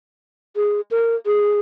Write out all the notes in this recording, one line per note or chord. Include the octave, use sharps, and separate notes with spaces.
G#4
A#4
G#4